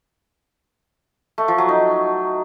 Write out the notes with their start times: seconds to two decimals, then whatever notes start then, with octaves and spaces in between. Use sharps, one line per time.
1.38 A3
1.48 F3
1.58 F#3
1.69 D#4